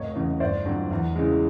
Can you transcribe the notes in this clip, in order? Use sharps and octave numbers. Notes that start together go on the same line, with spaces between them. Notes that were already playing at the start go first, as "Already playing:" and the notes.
Already playing: F1 C#5 D#5
E2 C#3
G1 C5 D5
F2 D3 F#3
E2
C#3 E3 G#3